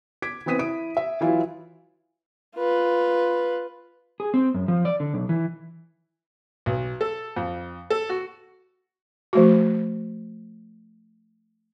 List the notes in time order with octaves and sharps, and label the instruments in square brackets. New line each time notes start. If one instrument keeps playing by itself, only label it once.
[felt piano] D6 G#6 B6 D7
E3 B3 C4 D#6 B6 D#7
E4 D#6 D7
E5
E3 F#3 E4 F4
[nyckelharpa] F4 B4
[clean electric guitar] G#4
C4
F#2
F3
D5
D3
B1
E3
[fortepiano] B1
A4
F2
A4
F#4
[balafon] F3 A3 F#4